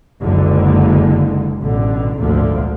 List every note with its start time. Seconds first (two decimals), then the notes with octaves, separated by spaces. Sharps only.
0.21 F#1 C#2 D3 D#3 G#3
1.61 A1 B2 D3
2.19 G#1 D2 A#2 D3 F3